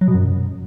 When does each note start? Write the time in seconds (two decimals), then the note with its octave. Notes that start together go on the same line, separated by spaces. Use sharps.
0.01 F#3
0.08 B2
0.14 F#2